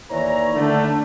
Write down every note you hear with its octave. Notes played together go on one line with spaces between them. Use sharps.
D#2 E3 C#5 D5 A#5
D3 A3